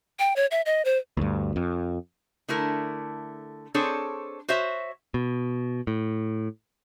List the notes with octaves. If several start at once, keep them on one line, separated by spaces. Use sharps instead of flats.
G5
C#5
E5
D#5
C5
D2 G2
F2
D3 A3 E4 A#4
C4 D4 G#4 A4 C5 C#5
F#4 C5 C#5 E5
B2
A2